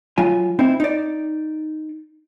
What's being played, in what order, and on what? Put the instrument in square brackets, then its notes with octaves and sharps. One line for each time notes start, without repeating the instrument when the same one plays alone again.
[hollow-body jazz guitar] F#3 F4 G#5
C4 D#4 E4 C5
D#4 D5